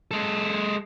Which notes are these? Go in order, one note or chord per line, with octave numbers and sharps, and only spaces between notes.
G#3 A4